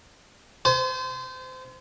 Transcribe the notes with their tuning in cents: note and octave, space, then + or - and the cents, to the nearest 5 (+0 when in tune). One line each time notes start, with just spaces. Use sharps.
C5 -25 G#5 +40